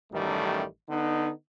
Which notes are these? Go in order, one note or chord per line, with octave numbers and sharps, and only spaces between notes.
A1 F#2 D#3 G3 A3
D3 B3 D#4